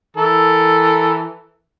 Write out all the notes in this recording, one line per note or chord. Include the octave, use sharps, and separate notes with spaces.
E3 A4 A#4